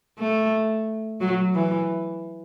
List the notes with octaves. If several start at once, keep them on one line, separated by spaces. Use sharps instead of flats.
A3
F#3
E3